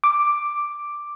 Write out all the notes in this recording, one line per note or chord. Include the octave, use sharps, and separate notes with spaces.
D6